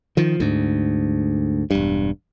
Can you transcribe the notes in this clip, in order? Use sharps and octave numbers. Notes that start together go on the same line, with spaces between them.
D#3 F3
D2 G#2
E1 G2